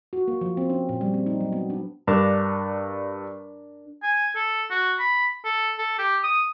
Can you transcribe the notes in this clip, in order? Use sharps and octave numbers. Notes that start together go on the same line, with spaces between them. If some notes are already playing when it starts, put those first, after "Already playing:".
F#4
A#3
F3
C4
C#4
A#2
G3
C4
D#4
F#3
B3
D4
G2 D4 A#4
G#5
A4
F#4
B5
A4
A4
G4
D#6